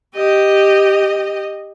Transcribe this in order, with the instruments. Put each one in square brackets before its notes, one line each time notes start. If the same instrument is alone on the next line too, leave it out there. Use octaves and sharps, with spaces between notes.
[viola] G4 D#5